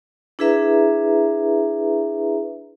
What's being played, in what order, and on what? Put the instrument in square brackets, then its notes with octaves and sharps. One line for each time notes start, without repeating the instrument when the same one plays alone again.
[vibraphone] D4 E4 G#4 B4 E5 A#5